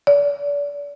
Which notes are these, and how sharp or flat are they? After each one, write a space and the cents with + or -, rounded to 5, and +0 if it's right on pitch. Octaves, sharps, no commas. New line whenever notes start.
D5 -30